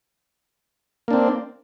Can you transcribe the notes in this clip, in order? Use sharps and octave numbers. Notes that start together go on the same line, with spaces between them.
A#3 C4 D4